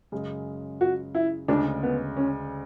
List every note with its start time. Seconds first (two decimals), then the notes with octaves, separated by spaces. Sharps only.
0.12 F#2 C#3 G#3
0.81 F#4
1.15 E4
1.48 D2 C#3 G#3 D4
1.83 B3
2.17 C#4